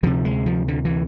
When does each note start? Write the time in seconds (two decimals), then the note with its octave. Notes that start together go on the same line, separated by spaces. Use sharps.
0.03 D2 C3 F3
0.25 G#3
0.46 F3
0.68 D3
0.85 E3